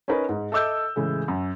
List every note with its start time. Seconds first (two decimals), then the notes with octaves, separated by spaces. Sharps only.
0.08 C#4 D#4 A#4 B4
0.29 G#2
0.52 A4 D#5 E5 D6 E6 G6
0.96 A2 C#3 E3 G#3
1.28 F#2